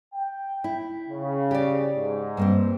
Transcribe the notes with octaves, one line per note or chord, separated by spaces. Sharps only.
G5
E4
C#3
G4 D5
G#2
G2 A#3 C4